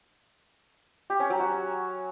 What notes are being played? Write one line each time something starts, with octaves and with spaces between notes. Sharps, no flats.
G4
C#4
F#3
F#4